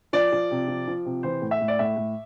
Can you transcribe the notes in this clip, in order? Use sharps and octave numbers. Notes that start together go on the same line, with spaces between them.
F3 D5
F3
C3
F3
F3
C3
E3 C5
A2
E5
A2
D5
A2 E5
A2